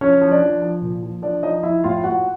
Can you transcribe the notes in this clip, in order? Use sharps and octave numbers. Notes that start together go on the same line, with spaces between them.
F3 C#4 C#5
F3
D4 D5
F3
F3
A#2
F3
F3 D4 D5
F3 D#4 D#5
F3 E4 E5
A2 F4 F5
A2 F#4 F#5